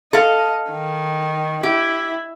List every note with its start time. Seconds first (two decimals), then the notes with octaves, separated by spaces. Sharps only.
0.13 A4 D#5 F5
0.70 D#3
1.63 E4 G4